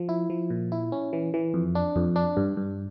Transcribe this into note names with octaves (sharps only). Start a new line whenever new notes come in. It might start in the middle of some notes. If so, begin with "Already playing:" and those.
Already playing: F3
E4
F3
A#2
E4
C#4
E3
E3
F2
D4
F2
D4
G2
G2